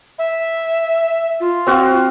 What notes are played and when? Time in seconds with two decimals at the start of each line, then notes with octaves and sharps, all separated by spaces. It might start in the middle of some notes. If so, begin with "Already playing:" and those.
0.19 E5
1.40 F4
1.67 C4 F#4 F5